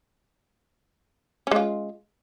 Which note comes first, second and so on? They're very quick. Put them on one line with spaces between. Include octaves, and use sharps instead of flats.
C#4 G#3 F4